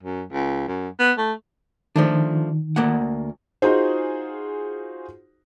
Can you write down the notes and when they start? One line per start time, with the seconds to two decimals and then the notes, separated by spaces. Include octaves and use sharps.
0.03 F#2
0.32 C#2
0.68 F#2
1.00 B3
1.18 A3
1.96 D#3 F3 A3 D4
2.76 D2 A#3 F#5
3.62 D#4 F4 F#4 G#4 C5